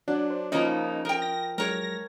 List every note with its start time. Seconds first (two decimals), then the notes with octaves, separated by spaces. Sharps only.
0.08 F#3 D4
0.30 C5
0.52 C#3 F3 A#3 C#4 D#4 D#5 B5
1.05 A#4 D#5 G5
1.22 A#6
1.58 F#3 G#3 A#4 C#5 A#6